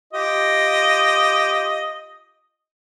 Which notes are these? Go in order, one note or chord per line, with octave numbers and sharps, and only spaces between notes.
F4 G4 D#5